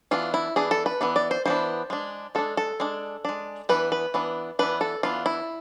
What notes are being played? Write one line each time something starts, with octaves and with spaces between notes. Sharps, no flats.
E3 B3 D4 F4
E4
E3 B3 D4 G#4
A4
B4
E3 B3 D4
D5
C5
E3 B3 D4 C5
G#3 D4
G#3 D4 A4
A4
G#3 D4
G#3 D4
E3 B3 D4 B4
B4
E3 B3 D4
E3 B3 D4 B4
A4
E3 B3 D4 F4
E4